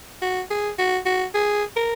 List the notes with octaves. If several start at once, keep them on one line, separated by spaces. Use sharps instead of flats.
F#4
G#4
F#4
F#4
G#4
A#4